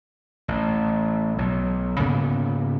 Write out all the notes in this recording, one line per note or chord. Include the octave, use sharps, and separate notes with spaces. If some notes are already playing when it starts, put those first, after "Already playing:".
A1
B1
G#2 C#3 A#3 B3